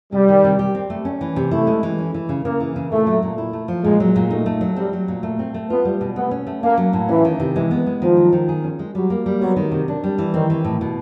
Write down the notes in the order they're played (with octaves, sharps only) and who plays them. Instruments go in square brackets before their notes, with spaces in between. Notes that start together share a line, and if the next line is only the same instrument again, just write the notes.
[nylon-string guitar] C3 [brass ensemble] G3
[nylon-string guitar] D#3
C3
G4
C4
A3
C#4
E3
C3
[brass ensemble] A3 [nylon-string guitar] E4
[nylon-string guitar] G#3
E3
C#4
E3
C#3
[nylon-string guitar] C#3 [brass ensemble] A#3
[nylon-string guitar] E3
C#3
[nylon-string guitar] A#2 [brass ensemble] A3
[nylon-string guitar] F#3
A#2
E4
A3
F3
[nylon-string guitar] A#2 [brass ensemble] G#3
[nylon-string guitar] F#3
A#2
[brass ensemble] A3 [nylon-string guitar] D#4
[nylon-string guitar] A3
F#3
[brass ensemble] G3 [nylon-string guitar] C4
[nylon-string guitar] F#3
A#2
A3
C4
A3
[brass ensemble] B3 [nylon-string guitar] F4
[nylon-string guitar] G3
B2
[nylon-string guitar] A3 [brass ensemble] B3
[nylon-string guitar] C#4
A3
[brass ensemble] A#3 [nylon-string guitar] C#4
[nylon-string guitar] F#3
A2
[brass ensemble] E3 [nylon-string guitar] C#4
[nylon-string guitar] D#3
C3
[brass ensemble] E3 [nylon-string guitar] G#3
[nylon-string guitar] B3
G#3
[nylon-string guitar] D#3 [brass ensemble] F3
[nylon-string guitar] F#3
D#3
G#4
C#4
G#3
[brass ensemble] F#3 [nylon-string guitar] G3
[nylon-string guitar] A#3
G3
[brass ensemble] F#3 [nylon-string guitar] B3
[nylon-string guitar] D#3
C3
D4
G3
E3
[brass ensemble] D#3 [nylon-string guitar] C4
[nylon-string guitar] E3
A2
B2